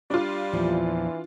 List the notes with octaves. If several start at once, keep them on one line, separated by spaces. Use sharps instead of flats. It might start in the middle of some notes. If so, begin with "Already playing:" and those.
G3 D4 F4
E2 A#2 E3 F3